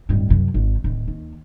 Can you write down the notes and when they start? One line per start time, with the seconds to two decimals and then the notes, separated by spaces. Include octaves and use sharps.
0.09 D1 G2
0.28 C2 F#2
0.54 G#1
0.84 D1
1.08 D#2